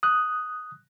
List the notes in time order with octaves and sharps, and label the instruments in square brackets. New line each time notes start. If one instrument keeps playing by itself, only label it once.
[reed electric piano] D#6 F#6